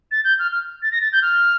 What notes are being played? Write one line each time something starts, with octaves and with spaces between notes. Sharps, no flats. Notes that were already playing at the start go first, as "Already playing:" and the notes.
A6
G6
F6
F6
A6
A#6
A6
G6
F6